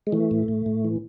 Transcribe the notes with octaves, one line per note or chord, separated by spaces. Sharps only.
G#3
E3 A3
A2
A2
A2
E3